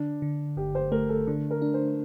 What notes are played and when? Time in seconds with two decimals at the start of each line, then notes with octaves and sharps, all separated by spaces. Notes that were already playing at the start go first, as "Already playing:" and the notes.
Already playing: D3 D4
0.22 D3
0.57 G1 G4
0.75 C5
0.92 A3 A#4
1.09 A4
1.27 D3 D4
1.51 A#4
1.62 D4
1.74 C5